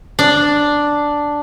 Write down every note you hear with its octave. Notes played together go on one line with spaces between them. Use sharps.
D4